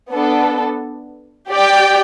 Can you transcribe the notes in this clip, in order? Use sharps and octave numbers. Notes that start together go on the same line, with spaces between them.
B3 D4 A4
G4 D5 G5